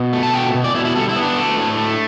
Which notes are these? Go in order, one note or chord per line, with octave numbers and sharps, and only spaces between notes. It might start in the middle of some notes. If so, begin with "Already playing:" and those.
Already playing: B2
A3
A5
B2 G5
B2
D5
B2 E4
E4
G3 A4
E4
B3
D4
A3
A2
A3